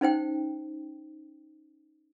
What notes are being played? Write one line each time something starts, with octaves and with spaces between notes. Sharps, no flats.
C#4 D#4 C5 G5